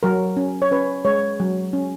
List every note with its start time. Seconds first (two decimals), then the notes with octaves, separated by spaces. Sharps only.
0.03 F#3 A#4
0.37 C#4
0.62 C#5
0.71 C#4 B4
1.05 G#3 C#5
1.40 F#3
1.73 C#4